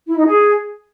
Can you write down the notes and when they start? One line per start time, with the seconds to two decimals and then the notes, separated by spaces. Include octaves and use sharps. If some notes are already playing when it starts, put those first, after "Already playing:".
0.07 E4
0.17 D#4
0.26 G#4